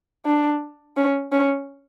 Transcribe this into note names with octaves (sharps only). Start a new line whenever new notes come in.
D4
C#4
C#4